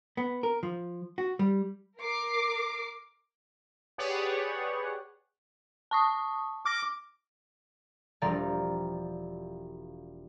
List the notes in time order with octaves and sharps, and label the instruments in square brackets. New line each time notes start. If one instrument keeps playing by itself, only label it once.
[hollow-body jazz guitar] B3
A#4
F3
F#4
G3
[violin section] A#4 D6 C7
[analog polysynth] G4 G#4 B4 C#5 D5 F#5
[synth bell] A5 C#6 D#6
[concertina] D6 [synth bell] F6 A#6
[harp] E1 F3 G3 D5 A#5